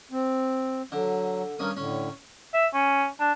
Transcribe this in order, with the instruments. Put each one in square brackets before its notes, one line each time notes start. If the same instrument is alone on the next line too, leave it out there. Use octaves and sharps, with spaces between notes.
[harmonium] C4
[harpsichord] D3 [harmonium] F#3
[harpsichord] G2 C#4 D#6 [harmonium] A#4
[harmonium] A2 D3 [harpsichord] C#4
[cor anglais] E5
C#4
D4